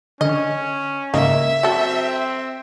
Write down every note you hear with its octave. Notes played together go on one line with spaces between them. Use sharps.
D3 C#4 D#5
G#2 C#3 A#3 D#5 E5
F#3 C4 A4